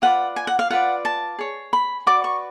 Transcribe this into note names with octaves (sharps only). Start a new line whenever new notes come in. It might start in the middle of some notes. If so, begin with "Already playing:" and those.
F4 B4 D5 F#5
G#5
F#5
F5
F4 B4 D5 F#5
A5
G#4 C#5
B5
F#4 B4 D5 D6
C#6